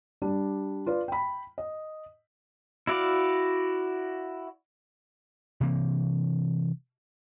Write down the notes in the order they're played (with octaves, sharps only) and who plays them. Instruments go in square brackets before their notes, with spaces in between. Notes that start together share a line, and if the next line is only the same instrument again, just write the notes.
[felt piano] G3 D4
F4 B4 D5
G5 B5
D#5
[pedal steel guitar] E4 F#4 D5 F5
[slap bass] C3 E3 A#3 C4